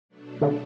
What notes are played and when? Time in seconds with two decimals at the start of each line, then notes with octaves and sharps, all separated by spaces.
0.09 B2 F#3 A3 D4
0.41 D3